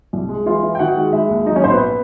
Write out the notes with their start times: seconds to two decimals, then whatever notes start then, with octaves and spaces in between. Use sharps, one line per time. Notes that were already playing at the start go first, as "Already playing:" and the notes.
0.13 C2
0.29 G#3
0.46 E3 F4 F5
0.63 E3
0.75 G5
0.79 D#3 F#4 F#5
0.97 G#3
1.13 G#3 E4 E5
1.29 D#2
1.46 F#3 D#4 D#5
1.56 C#4 C#5
1.64 A#1 C4 C5
1.72 B3 B4